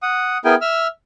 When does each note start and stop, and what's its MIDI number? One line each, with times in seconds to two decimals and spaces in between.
0.02 0.38 78
0.02 0.38 87
0.45 0.55 59
0.45 0.55 64
0.45 0.55 68
0.45 0.55 70
0.45 0.55 79
0.45 0.55 80
0.61 0.87 76
0.61 0.87 88
0.61 0.87 89